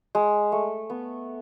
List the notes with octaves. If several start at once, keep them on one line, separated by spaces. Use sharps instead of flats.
G#3
A3
B3